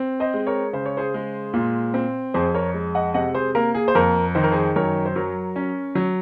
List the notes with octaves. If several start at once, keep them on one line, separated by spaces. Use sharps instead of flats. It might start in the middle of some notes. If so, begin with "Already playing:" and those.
Already playing: C4
C5 D#5
G#3
A#4 C#5
C#3 C5
C#5
G#4 C5
G#3
A#2
C4
F2 G#4 C5
A#4 C#5
G#3
D#5 F#5
C3 D#5 F#5
G#4 C5
A#3 A#4
G#4
C5
F2 A#4
D#3 C5
A#4
G#4 C5
F#2 A#4 C#5
C5
F#3 A#4 C#5
C#4
F#3